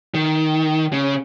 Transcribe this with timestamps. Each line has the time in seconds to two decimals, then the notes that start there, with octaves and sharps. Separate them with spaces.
0.14 D#3
0.92 C#3